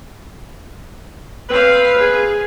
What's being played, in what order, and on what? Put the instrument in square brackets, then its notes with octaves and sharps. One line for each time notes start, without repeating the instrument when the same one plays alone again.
[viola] C4 F5 [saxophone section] B4
[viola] G#4